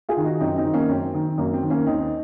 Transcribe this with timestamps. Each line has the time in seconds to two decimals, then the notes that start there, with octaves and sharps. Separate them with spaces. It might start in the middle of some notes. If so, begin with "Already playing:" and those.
0.09 F4 G#4
0.17 D#3
0.24 D#4 F#4
0.40 F#2 C4 D#4
0.57 C4 D#4
0.65 D#3
0.74 A#3 C#4
0.89 F#2 C4
1.14 D#3
1.38 F#2 A#3
1.54 C4
1.62 D#3
1.70 A#3 C#4
1.86 D#2 C4 D#4